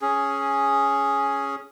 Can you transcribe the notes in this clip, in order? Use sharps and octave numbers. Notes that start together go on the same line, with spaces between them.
C#4 G#4